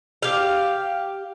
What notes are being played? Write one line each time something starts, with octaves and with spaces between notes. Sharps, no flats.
G4 F5